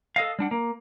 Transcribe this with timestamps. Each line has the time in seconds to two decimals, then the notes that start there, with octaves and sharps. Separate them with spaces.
0.16 A4 D#5 F5
0.39 G3 D4 F#5
0.51 A#3